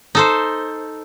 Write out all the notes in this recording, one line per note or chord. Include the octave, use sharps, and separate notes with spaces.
D#4 A4 C5